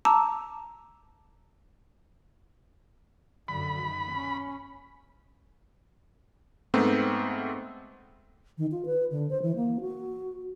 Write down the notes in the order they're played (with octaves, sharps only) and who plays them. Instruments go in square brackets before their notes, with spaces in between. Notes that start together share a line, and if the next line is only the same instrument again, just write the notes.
[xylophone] A5 A#5 D6 E6
[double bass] F#2 D3 [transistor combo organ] B5
[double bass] D#3
C#4
[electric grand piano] G#2 A3 B3 C4
[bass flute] D#3
F4
B4
D3
C5
E3
A#3
F#4